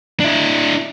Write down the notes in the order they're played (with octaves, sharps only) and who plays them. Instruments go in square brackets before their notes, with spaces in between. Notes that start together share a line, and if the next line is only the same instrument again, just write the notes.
[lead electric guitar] D4 E4